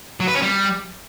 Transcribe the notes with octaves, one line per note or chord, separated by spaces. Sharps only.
F#3
B4
C#4
G3